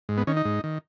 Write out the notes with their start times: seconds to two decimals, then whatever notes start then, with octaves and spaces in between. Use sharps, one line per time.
0.09 G#2
0.18 B3
0.27 D#3 C#4
0.37 D#4
0.45 G#2
0.64 D#3